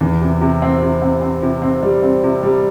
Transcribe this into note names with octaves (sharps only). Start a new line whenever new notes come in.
E2
C3
C3
C4
C3
C4
C4
C3
C4
G3
C4
C3
G3